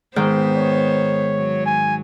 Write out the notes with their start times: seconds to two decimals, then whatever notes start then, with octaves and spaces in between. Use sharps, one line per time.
0.16 G#2 D#3 B3 C5 G5
0.57 C#5
1.36 F#3
1.66 G#5